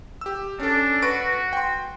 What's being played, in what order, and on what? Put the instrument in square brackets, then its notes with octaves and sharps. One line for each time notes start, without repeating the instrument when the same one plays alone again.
[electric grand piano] G4 E6
[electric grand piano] C#4 A4 [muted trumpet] D4
[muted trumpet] F#4 [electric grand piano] B4 C#6 D7
[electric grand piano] G5 C6